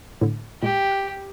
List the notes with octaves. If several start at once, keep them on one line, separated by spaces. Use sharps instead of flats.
A2 D3
A#2 G#3 G4
F#6